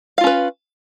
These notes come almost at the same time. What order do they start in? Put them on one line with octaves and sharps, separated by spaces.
F5 F4 C#4 B4